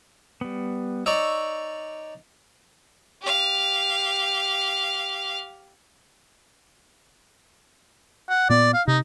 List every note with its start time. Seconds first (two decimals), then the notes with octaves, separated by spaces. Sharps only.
0.41 G3 B3
1.06 D#4 C#5 D5 C#6 E6
3.22 G4 F5
8.29 F#5
8.49 A#2 B3 D5
8.73 F5
8.88 C3 D#4